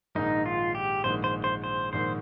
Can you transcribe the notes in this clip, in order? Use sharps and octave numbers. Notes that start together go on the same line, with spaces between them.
A#1 G#2 D#3 G#3 D#4
F4
G4
A#1 G#2 D#3 G#3 C5
C5
C5
C5
A#1 G#2 D#3 G#3 C5